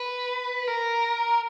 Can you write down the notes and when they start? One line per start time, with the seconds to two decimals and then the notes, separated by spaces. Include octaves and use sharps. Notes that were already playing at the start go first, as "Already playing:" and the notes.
Already playing: B4
0.68 A#4